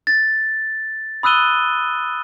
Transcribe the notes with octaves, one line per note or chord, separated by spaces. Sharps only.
A6
B5 D#6 E6 F#6 D#7 G7